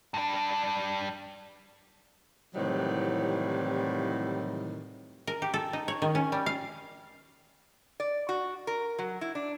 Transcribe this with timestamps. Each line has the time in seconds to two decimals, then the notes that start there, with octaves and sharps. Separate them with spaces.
0.14 G2 D4
2.54 A2 C3 D#3 E3 F#3 G3
5.27 A#4
5.42 G4
5.54 A4
5.73 D#4
5.88 C#5
6.02 D#3
6.15 C#4
6.32 G3
6.46 F5
8.00 D5
8.29 F#4
8.67 A#4
8.99 F#3
9.21 E4
9.35 D4